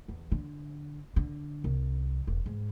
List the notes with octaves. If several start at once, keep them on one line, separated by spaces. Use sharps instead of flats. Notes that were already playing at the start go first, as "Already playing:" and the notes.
E2
D3
D3
C2
E1
G#2